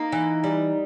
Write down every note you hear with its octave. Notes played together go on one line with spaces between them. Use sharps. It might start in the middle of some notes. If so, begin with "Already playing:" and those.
Already playing: A#3 D#4
E3
G3